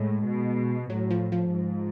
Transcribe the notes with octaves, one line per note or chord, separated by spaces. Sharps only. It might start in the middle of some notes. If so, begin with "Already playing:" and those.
Already playing: A2 G#3
B2
A2 F#3
F3
F3
G#2